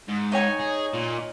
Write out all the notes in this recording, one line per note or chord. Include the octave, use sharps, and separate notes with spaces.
G#2
D#4 C#5 G#5
G#4
A#2